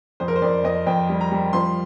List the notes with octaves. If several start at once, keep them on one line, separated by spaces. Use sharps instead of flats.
F2 C5
A#4
C5
F2 D5
F2 D#5
F2 G5
G3
A#5
G3
F3 C6